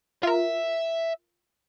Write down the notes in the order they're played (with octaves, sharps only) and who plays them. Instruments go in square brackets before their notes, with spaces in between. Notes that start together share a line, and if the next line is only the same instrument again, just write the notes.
[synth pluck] F4 A#4 [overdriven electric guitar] E5